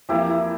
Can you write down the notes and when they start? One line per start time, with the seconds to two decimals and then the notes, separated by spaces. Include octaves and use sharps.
0.09 F2 E3 A#3 E4 F4 G4
0.30 E4